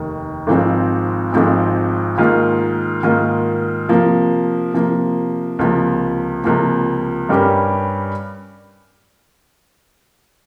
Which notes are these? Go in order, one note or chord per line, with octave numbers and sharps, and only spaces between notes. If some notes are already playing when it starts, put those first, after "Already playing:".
Already playing: F1 D#2 D#3
G#1 G#2 F3 C4
G#1 G#2 F3 C4
G#2 D#3 A#3 F4
G#2 D#3 A#3 F4
C3 F3 A#3
C3 F3 A#3
C#2 C3 F3 A#3
C#2 C3 F3 A#3
G2 G3 C#4 G4 A#4